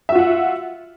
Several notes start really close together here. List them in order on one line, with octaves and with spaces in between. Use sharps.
E5 F#4 F4 F#5